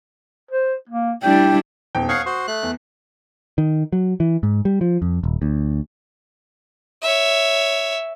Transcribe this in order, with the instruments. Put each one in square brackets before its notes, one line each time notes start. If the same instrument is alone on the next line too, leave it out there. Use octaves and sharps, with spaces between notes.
[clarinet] C5
A#3
[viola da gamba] G3 D4 E4 [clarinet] G5
[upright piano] D#1 E2 G5
[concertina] C#5 F5 F#5 [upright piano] D#6 C7
[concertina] F#4 C5
A3 F#6
[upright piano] E2
[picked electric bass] D#3
F#3
E3
G#2
G3
F3
F2
D#1
D2
[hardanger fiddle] C#5 E5